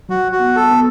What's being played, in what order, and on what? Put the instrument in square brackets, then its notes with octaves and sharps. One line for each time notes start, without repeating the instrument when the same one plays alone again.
[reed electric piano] F#3 [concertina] F#4
[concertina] F#4
[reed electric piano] B3
[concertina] A4
[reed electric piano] B3